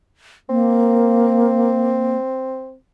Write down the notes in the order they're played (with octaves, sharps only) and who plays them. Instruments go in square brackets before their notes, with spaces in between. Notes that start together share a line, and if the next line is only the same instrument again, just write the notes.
[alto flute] A#3 [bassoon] C4